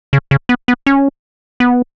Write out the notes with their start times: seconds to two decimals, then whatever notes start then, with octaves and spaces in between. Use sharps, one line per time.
0.13 C#3
0.31 C#3
0.49 B3
0.68 B3
0.86 C#4
1.60 B3